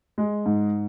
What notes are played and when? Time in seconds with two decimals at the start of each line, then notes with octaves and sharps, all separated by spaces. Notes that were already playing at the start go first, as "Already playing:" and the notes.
0.18 G#3
0.46 G#2